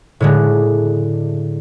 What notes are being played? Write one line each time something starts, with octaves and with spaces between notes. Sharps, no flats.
A2 D3 G#3